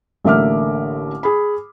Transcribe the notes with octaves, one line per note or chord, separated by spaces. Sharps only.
A1 D3 A#3 E5 D6 F6
G#4 B5